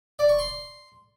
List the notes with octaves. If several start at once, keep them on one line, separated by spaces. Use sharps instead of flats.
D5
C#6
C6